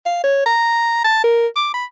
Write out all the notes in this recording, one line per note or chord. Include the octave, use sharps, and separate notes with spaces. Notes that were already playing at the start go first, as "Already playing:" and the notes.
F5
C#5
A#5
A5
A#4
D6
B5